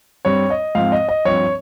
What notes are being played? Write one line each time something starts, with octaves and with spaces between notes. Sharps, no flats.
G2 G3 C4 C#5
D#5
G#2 F3 C4 F5
D#5
D#5
G2 F3 C4 C#5